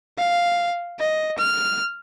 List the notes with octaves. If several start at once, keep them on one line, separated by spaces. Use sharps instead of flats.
F5
D#5
F6